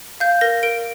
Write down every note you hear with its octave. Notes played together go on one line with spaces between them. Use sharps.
F5 G6
A#4 A#6
A#4 D7